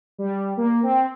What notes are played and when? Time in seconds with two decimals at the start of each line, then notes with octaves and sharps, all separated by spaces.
0.18 G3
0.57 A#3
0.83 C4